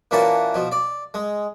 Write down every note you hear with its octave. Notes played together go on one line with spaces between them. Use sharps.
A#2 E3 A#3 C#4 F#4 A5
B2 F3
D5
G#3